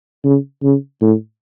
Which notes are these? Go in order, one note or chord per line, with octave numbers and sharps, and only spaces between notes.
C#3
C#3
A2